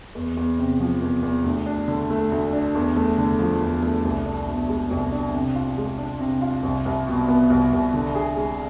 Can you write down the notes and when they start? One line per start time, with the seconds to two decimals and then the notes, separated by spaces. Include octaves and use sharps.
0.15 E2
0.37 E2
0.59 C3
0.80 F3
1.02 E2
1.23 E2
1.44 D2
1.66 D4
1.88 D3
2.10 A3
2.32 D2
2.53 D4
2.75 E2
2.97 A3
3.18 D3
3.39 F3
3.61 E2
3.83 A3
4.04 C2
4.25 D4
4.47 B2
4.69 G#3
4.91 C2
5.12 D4
5.34 C3
5.56 F4
5.77 G#3
5.98 D4
6.20 C3
6.42 F4
6.63 C2
6.86 C2
7.07 B2
7.28 B3
7.50 C2
7.72 C2
7.94 D3
8.15 G#4
8.36 G#3